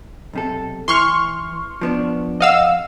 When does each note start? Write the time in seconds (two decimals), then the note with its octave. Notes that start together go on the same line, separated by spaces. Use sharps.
0.33 B1 C3 A4
0.88 E3 C6 C#6 F6
1.81 F3 B3 D4
2.40 F2 D#5 F5 F#5 E6